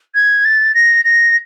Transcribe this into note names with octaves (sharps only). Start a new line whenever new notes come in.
G#6
A6
A#6
A#6